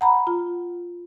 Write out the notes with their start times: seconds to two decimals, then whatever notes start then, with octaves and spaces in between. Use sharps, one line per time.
0.01 F#5 A#5 B5
0.27 F4